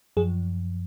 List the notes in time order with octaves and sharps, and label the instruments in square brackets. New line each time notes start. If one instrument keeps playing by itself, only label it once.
[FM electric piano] F#2 F3 G#4